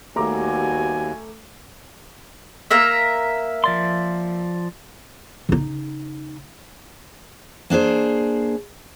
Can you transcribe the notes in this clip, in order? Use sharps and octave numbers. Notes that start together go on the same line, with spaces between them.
D#2 G3 A3 B3 F#4 G#5 A#5 D6
A#3 A#4 E5
F3 D5 C6
C#3 D#4
A#3 D4 G#4 C5